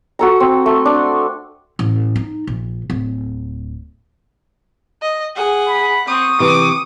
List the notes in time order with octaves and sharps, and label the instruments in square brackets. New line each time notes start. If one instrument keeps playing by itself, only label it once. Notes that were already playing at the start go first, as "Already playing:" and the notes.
[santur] F#4 A4 A#5
C4
A3
D4
[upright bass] A1
D#4
A#1
D1
[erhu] D#5
[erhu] G#4 [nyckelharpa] F#5
[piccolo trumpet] B5
[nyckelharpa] C4 [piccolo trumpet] C#6 [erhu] D#6
[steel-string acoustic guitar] C3 E3 [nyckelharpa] D6